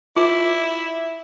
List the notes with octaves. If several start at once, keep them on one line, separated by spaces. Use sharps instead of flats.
E4 F4